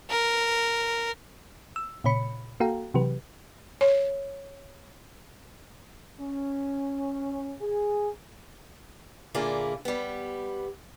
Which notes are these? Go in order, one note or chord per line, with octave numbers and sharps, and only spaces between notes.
A#4
E6
A#2 C#3 C#5 B5 C#7
A#3 F#4 A4 F5 G5 A#5
C3 E3 F#3 G4 B4
C#5
C#4
G#4
A#2 D3 A#3 E4 F4 G#4
G3 B3